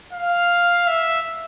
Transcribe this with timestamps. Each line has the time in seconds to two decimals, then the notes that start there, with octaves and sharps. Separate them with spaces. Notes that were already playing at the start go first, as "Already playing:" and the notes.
0.13 F5
0.87 E5